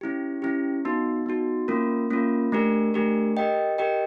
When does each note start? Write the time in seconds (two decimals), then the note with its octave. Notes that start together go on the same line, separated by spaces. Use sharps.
0.01 C#4 E4 G4
0.42 C#4 E4 G4
0.85 B3 D#4 F#4
1.26 B3 D#4 F#4
1.68 A#3 C#4 F4 A#4
2.10 A#3 C#4 F4 A#4
2.52 A3 D4 G4 A#4
2.94 A3 D4 G4 A#4
3.37 G4 A#4 D#5 G5
3.78 G4 A#4 D#5 G5